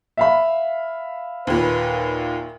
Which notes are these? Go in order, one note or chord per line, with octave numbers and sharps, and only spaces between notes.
E5 F5 B5
D#2 A#2 B4